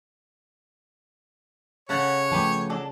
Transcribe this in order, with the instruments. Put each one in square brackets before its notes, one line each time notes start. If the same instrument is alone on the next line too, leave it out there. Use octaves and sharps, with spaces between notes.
[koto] C#3 A4 F#5 [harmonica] C#5
[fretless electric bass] F3 A3 [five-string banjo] G4 B4 A5
[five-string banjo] F#3 D4 A4